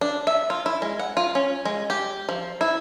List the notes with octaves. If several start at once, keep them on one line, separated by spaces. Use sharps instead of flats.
D4
E5
F4
E4
G#3
F#5
F4
C#4
G#3
G4
F3
E4